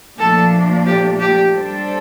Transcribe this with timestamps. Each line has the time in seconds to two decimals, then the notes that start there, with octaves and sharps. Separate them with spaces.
0.18 A#2 F3 A3 D4 A4
0.87 G4
1.20 G4
1.54 G3 D4 A4 C5